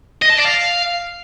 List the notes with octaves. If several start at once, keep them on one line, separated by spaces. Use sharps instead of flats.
D#5
A5
D5
F5